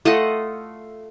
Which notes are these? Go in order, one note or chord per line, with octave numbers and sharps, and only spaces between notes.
A3 F4 D#5 F#5